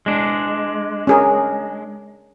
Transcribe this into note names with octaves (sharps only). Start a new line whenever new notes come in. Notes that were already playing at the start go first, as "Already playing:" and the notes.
G#3 D4
C#4 G#4 A#4